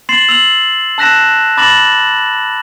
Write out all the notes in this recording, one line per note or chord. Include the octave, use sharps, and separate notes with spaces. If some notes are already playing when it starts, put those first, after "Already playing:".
C6 A6 C7 E7 F#7
E6 F7 F#7
A5 E6 F#6 A#6 B6 E7
B5 D6 A6 A#6 E7 F#7